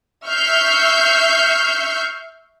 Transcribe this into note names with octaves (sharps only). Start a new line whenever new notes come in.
E5 C#6 F6 G6 C7